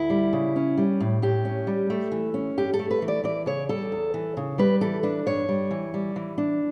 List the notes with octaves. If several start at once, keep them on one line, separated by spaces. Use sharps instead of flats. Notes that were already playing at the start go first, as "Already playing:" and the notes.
Already playing: D2 E4
G3
C#3
C#4
G3
A2
A2 G4
C#4
G3
A3
E3
C#4
G2 G4
A4
A3
B4
E3
D5
E3 D5
C#3 C#5
G3 A4
E2
E3
C#3
G3 B4
E3 A4
D4 B4
G2 C#5
G3
E3
G3
E3
D4